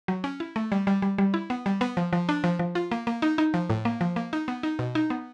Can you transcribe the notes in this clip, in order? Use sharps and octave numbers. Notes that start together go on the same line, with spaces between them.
F#3
C#4
E4
A3
G3
G3
G3
G3
E4
B3
G3
B3
F3
F3
D4
F3
F3
F4
A#3
A#3
D#4
D#4
F3
A2
A#3
F3
A#3
D#4
B3
D#4
B2
D#4
B3